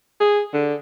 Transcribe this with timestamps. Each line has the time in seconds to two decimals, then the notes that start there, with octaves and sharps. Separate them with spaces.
0.20 G#4
0.54 D3